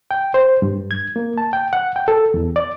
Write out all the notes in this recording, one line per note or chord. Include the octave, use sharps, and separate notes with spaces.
G5
C5
G2
G#6
A#3
A5
G5
F#5
G5
A4
E2
D5